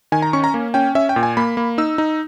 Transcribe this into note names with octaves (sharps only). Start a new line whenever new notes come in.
D#3 G#5
A#5
C#4 C#6
A#5
A#3
C#4 G5
C#4 E5
G5
A#2
G#5
A#3 B5
A#3
D#4 E6
D#4